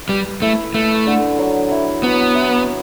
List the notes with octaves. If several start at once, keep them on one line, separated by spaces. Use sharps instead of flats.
G3 B4
A3 E4
A3 B4
D3
F#3
E4
F#3 B3
E4